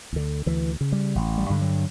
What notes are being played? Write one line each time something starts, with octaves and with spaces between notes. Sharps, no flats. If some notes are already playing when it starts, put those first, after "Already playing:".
D2 D3
D2 E3
C#3
G3
A1
G3
G2 D3
F#3